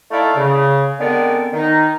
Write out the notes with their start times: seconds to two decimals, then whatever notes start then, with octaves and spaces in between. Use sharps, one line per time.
0.11 A3 D#4 E4 A4 D5 F5
0.37 C#3
1.00 D3 G#3 B3 C4 A#4 D5
1.54 D#3 D#4